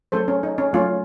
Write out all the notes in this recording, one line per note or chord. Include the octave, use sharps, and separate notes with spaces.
F#3 A3 C#4 A4 C5
C#4
D#4
C#4
F#3 A3 C#4 F4